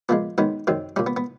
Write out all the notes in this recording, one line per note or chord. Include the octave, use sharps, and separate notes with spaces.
A#2 F3 G#3 B3
G#2 D#3 F#3 B3
F#2 D#3 F#3 C4
A#2 G3 C#4
B3
B3